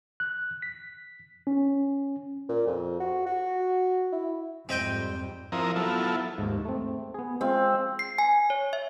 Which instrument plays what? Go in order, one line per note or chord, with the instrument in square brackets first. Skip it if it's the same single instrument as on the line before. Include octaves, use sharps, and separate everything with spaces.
[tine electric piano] F#6
B6
C#4
[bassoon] A#2
F2
F#4
F#4
E4
[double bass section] F2 G#2 G3 [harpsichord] C4 D#5 G5
[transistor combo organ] F3 C4 E4 A#4 A#5 D#6
F#3 B3 E4 F4 A4
[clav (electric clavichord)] D#2 G#2
A3 C4
B3 G#4
[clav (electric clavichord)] G#3 F4 F5 [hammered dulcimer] C4
[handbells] C7
G#5
C#5
E5